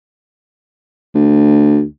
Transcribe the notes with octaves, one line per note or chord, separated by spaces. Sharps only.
D2